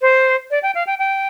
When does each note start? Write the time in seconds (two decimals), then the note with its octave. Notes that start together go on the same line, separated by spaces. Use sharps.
0.02 C5
0.51 D5
0.63 G5
0.75 F5
0.87 G5
0.99 G5